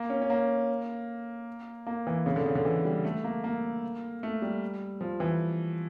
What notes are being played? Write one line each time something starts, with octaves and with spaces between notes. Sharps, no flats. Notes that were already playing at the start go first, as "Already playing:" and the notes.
Already playing: A#3
C#4
C#4
A#3
A#3
E3
C#3
D3
C#3
D3
E3
G3
A3
A#3
A#3
A3
G3
F3
E3